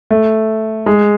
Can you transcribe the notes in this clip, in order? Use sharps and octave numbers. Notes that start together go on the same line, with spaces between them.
A3
G#3